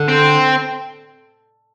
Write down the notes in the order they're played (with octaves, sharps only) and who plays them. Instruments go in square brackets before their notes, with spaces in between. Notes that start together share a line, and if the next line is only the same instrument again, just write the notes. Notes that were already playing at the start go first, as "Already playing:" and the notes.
Already playing: [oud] D3
[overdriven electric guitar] C4